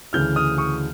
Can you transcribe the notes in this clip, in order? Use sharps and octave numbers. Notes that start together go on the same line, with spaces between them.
D2 C#3 E3 F6 G6
D#6 F6
C#6 D#6